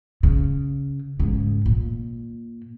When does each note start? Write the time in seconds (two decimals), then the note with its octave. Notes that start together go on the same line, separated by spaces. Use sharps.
0.23 C#3
1.20 G#2 C#3
1.66 A#2